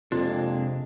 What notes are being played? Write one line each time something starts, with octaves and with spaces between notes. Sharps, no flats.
F2 C3 G#3 A#3 D4 F4